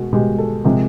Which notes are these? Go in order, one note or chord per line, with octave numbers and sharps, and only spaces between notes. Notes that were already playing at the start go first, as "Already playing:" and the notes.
Already playing: B2 G#3 F#4
B2 G#3 G4
A4
C3 F3 G#3 A#4